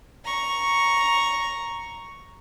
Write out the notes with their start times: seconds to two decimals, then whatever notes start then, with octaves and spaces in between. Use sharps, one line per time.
0.24 A#5 C#6